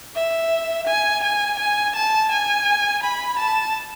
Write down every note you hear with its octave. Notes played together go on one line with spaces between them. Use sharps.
E5
G#5
G#5
G#5
A5
G#5
B5
A5